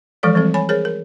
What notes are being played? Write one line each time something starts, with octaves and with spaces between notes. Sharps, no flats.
E3 F3 G#3 A4 D5
E3 G3 C4 A4
C#5 G#5 B5
G#4 A#4 C5 C#5
A#4